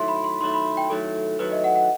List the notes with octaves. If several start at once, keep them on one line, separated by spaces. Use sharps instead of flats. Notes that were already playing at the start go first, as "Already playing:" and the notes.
Already playing: D#3 F#3 A3 E4 C6
B5
C6
D#3 F#3 A3 E4 C6
B5
G5
D#3 F#3 A3 E4 A4
D#3 F#3 A3 E4 B4
D#5
F#5
F#5